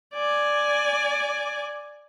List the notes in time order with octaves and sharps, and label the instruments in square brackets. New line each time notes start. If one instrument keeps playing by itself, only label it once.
[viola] D5 G#5